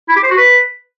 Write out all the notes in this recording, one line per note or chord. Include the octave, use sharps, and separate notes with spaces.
E4
G4
C5
F#4
B4